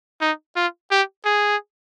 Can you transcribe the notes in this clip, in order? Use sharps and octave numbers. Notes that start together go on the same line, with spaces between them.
D#4
F4
G4
G#4